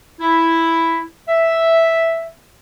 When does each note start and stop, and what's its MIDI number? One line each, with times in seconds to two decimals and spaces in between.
0.20 1.01 64
1.29 2.28 76